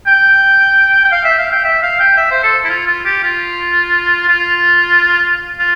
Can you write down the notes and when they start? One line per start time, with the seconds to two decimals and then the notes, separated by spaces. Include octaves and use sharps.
0.07 G5
1.04 G5
1.12 F5
1.25 E5
1.38 F5
1.52 G5
1.64 E5
1.83 F5
2.00 G5
2.17 E5
2.31 C5
2.43 A4
2.65 E4
2.69 F4
2.87 F4
3.05 G4
3.23 F4
4.28 F4
5.60 F4